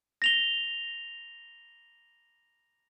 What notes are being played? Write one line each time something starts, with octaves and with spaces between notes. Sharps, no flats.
A#6 F7 G7